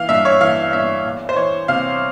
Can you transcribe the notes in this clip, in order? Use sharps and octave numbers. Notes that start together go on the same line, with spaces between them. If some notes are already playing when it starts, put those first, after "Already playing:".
Already playing: E3 F5
G2 E5
C#5
E3 F5
G2 E5
E2
C5
E3 C#5
C3 F5